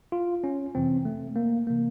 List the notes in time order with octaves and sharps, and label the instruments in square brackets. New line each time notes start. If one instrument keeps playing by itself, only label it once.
[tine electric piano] F4
C#4
F2 C3 E3 C4
A3
A#3
C3 E3 A#3